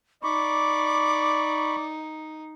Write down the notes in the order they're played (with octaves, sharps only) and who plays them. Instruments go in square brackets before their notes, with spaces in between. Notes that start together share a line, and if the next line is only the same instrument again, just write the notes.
[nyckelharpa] D#4 [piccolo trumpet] D5 [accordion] B5 C#6 [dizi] D6